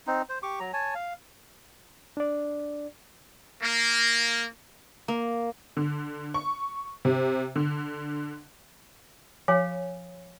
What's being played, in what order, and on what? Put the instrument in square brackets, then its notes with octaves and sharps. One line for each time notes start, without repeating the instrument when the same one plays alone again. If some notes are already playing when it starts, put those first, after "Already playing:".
[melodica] C4 D#4
C5
G4 C#6 D6
F#3 A#5
C#5 G#5 A5
F5
[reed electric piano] D4 D5
[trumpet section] A#3
[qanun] A#3
[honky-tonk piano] D3
C#6
C3
D3
[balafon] F3 [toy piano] C#5 F5 G#5